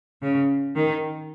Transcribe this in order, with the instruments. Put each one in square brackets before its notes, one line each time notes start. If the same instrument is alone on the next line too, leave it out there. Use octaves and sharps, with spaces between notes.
[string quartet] C#3
D#3